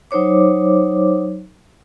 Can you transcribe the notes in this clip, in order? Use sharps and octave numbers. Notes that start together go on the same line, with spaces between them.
F#3 D#4 C5 C#5 D6